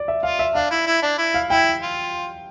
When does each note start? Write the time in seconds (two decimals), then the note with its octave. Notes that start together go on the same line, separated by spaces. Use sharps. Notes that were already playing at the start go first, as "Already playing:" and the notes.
Already playing: D5
0.08 E5
0.23 F4 F5
0.39 E5
0.55 D4 F5
0.71 E4
0.87 E4
1.03 D4
1.18 E4
1.34 F5
1.50 E4 G5
1.83 F4